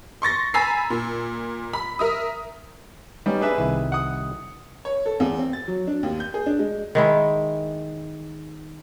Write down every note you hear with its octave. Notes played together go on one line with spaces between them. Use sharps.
C6 C#6 A6 A#6
G#5 A#5 B5 E6 A6 C7
A#2
B5
A#4 E5 D#6
G3 B3 C#4 D#4
D4 G#4 B4 E5
C2 D#3 E4
F#5 D#6
C#5
A4
E2
C4
A6
F#3
D4
D#2
G6
G#4
D4
G#3
D#3 G#3 E4